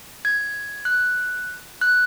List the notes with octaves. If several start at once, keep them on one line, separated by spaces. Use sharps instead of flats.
G#6
F#6
F#6